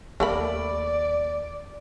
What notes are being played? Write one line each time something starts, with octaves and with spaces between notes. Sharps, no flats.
D#2 A3 A#4 D5 B5